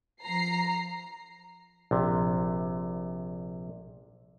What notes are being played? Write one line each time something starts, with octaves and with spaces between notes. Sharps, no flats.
F3 A#5 C7
A#1 C3